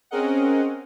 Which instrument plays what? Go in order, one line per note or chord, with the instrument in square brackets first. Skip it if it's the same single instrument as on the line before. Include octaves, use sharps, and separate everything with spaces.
[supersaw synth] C4 C#4 G#4 A#4 D#5 F#5